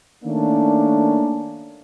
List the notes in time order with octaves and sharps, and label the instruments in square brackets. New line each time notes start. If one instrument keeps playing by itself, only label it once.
[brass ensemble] D#3 A3 A#3 C#4 D4